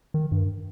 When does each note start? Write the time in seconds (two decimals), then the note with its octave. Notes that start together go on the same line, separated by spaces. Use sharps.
0.14 D#3
0.32 G2